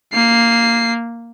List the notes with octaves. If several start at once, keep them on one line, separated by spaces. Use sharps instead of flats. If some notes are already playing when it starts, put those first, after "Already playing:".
A#3 C7